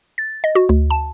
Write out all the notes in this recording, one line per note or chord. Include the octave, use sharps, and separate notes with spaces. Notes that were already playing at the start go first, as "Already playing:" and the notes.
A6
D#5
F#4
D2
A5